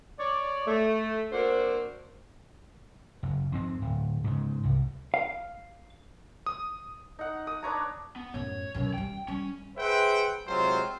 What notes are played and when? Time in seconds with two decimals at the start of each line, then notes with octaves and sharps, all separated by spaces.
0.19 C#5 D5
0.67 A3
1.32 A#3 C4 D4 F#4 C5
3.23 F#1
3.52 F2 G#2 C4
3.82 D1
4.24 G#2 C#3
4.63 C2
5.14 F5
6.46 D#6
7.19 D#4 F#5
7.47 D#6
7.63 D4 B4 C#5 A#5
8.16 B3
8.34 F#2 A2 C#5
8.74 F#2 B2
8.93 F#3 G3 G5
9.28 G3 C#4
9.78 G#4 B4 C5 E5 F#5 G5
10.48 C3 F#3 G#3 C4 F4 C5